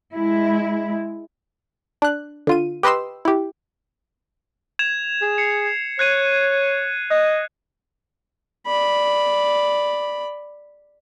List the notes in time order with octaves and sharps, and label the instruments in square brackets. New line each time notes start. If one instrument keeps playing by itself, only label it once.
[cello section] G#3 E4
[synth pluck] D4 F#6
D3 F4 D#7
G4 B4 D#5 C6 E6
E4 G4
[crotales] G#6 E7 F7
[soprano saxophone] G#4
[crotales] C7 C#7
[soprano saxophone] C#5 [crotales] F#6 G#6 D#7
[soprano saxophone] D#5 [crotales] F#6
[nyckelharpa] D5 B5